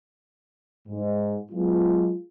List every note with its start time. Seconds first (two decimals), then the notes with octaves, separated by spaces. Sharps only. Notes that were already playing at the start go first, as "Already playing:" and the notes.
0.88 G#2
1.52 F#3 G#3 B3 F4